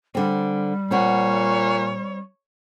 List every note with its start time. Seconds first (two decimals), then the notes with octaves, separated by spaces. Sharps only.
0.15 D3 G3 C4
0.91 A#2 C4 C#5 F#5